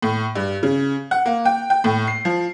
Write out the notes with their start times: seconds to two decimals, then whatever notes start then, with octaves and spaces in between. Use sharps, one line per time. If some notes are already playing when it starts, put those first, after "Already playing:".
0.02 A2
0.35 G2
0.63 C#3
1.11 F#5
1.25 A#3
1.45 G5
1.70 G5
1.84 A2
2.07 C7
2.25 F3